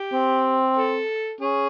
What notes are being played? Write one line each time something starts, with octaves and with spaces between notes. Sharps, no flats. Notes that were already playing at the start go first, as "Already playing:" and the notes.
Already playing: G4
C4
A4
C#4 G#4